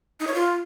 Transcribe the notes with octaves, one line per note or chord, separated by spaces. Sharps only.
D#4
C#5
F4